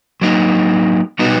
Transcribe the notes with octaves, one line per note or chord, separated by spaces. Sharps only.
F#3 A#3 D#4
B2 G3 B3 D#4 F#4